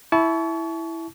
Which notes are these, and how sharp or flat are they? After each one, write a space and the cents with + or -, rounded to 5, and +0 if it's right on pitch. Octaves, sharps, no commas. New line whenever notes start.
E4 +0 A5 -30 C#6 +30